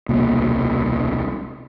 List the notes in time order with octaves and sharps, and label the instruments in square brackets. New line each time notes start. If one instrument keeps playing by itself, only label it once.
[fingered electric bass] D#1 C2 B2 A#3